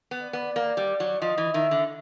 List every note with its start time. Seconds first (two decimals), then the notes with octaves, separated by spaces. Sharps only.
0.11 B3
0.22 D5
0.33 B3
0.56 A#3
0.77 G3
1.00 F#3
1.21 F3 D#5
1.38 E3
1.54 D#3 E5
1.71 D3